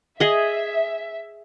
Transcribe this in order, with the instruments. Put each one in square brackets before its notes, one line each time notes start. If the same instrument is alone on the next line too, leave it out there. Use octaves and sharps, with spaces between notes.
[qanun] G#4 D#5 [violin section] E5